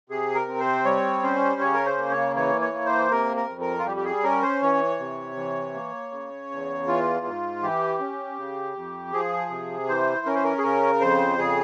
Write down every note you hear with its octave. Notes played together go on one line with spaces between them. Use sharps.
C3 G#4
A#4
C4
C5
G3 C#5
C#4 C5
C#3 C#5
A#4
C5
A#3
C#5
E3 C#5
C#5
A#3
C5
C3 A#4
A#4
F2
A#4
F4
G3 G4
G4
G#4
C#4 A#4
C5
E3 C#5
C3
E3
A#3
C#3
E2
E3 F4
G#2
E3 G4
C#4
C#3
F2
F3 G#4
C3
E3 C5
C#4 A#4
C5
A#4
G#4
C#3 A#4
F2 C5
C#3 G#4